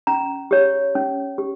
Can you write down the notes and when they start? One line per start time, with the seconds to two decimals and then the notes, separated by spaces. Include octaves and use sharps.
0.07 C#4 A#5
0.51 G4 C#5
0.95 C#4
1.38 G4